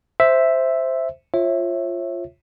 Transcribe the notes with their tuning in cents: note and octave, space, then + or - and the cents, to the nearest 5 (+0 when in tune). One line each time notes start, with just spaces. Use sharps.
C5 +0 E5 +0
F4 +0 C#5 -35 E5 +0